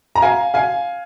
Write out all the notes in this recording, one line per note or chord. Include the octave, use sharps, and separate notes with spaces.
A#5
F5 G#5
F5 G#5